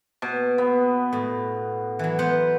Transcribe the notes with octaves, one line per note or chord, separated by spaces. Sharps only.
B2
B3
A2
E3 F#3
B3 B4 C5